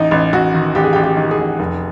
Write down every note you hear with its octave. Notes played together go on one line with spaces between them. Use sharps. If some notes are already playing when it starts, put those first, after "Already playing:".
Already playing: A1 D#4
A1
A1 F#4
D#3
A1 G4
G#4
G4
A1
G4
D#3
G4
G#4
A1
F1